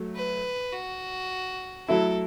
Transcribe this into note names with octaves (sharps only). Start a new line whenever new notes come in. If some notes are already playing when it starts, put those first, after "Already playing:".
Already playing: F#3 A3
B4
F#4
F#3 A3 E4 A4